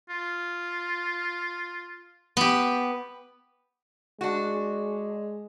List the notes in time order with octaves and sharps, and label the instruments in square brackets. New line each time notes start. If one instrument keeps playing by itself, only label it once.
[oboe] F4
[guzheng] B3 G4
[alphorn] G#3 [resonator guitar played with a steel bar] D4 F#4